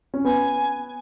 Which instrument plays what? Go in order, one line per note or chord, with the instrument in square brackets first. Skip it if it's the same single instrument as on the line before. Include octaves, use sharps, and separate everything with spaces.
[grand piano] C#4
[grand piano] B3 [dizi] G#5